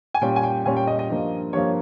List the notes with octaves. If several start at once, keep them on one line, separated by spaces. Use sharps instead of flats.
G#5
A#2 G3 C#4 G5
G#5
G5
A#2 G3 C#4 G#5
G5
D#5
D#5
G2 F3 A#3
G2 F3 A#3 C#5